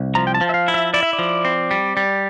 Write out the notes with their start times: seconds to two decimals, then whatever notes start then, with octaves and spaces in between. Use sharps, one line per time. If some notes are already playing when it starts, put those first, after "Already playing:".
Already playing: C2
0.15 F3 A#5
0.27 G5
0.35 A5
0.41 F3
0.49 E5
0.54 F5
0.68 E4
0.74 E5
0.94 E4 D5
1.03 E5
1.13 D5
1.19 F3
1.45 C4
1.71 G3
1.97 G3